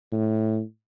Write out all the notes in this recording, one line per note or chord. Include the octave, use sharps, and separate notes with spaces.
A2